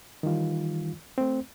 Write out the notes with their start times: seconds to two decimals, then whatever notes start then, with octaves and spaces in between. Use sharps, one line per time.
0.23 D#3 E3 G3 F4
1.18 A3 C4